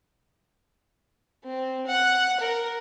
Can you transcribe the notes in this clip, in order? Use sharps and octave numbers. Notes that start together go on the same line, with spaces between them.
C4
F#5
A#4